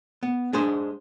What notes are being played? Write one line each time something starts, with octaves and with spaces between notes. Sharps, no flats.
B3
G#3 D4 G#4 C5